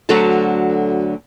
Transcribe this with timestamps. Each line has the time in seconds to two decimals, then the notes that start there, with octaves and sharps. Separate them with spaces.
0.09 D2 D3 F#3 C4 A4 A5